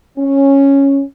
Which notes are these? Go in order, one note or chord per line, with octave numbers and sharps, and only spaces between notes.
C#4